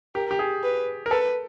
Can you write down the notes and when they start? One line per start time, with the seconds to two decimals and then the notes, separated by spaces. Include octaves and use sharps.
0.15 G4 A#4
0.31 G4
0.39 G#4
0.63 B4
1.06 A#4
1.11 A4 B4